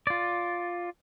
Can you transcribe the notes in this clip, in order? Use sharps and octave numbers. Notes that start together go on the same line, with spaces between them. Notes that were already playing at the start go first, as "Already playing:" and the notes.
F4 D5